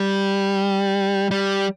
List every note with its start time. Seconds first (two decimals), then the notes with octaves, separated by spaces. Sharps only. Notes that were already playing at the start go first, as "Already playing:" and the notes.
Already playing: G3
1.31 G3